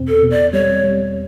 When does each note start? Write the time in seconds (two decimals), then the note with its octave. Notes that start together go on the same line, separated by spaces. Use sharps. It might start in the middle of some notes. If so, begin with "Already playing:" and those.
Already playing: E2 B2 C4
0.08 A4
0.23 B2
0.31 D5
0.53 G3 C#5
0.84 G3